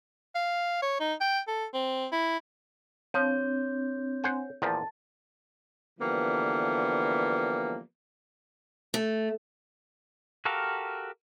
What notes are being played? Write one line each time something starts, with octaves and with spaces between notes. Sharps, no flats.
F5
C#5
D#4
G5
A4
C4
E4
F3 C4 D4 C#5 G6
C5 F#5 G#5
E2 A#2 F3 A5 A6
D3 E3 F3 G3 A#3 B3
A3
F#4 G4 A4 A#4 F5